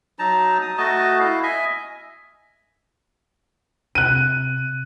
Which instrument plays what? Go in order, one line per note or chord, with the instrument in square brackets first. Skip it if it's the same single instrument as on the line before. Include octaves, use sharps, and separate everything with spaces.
[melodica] F#3 D#4 A5 A#5
D#6
A3 F#4 D#5 A5
E4 F5
D#5 E5 G#5
[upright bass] C3 [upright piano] F#6 D#7